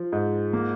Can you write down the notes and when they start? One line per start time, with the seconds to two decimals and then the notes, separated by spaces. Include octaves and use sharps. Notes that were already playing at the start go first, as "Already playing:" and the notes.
Already playing: F3
0.12 G#2
0.53 A#3